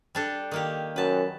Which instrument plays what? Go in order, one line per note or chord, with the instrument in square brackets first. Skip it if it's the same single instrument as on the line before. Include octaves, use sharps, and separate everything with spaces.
[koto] G3 D4 A4
D#3 A#3 G4
[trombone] F#2 [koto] B4 A5